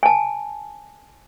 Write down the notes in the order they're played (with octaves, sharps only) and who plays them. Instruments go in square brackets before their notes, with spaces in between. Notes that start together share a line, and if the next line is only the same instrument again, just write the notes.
[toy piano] G#5 A5